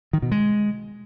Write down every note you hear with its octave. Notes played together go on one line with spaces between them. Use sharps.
D#3
B2
G#3